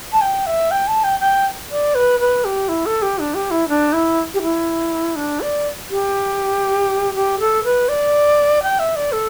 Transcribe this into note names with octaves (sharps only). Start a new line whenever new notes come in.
A5
G5
E5
G5
A5
G5
G5
D5
B4
B4
G4
E4
A4
G4
D4
G4
E4
D4
E4
G4
E4
D4
D5
G4
G4
A4
B4
D5
G5
E5
D5
A4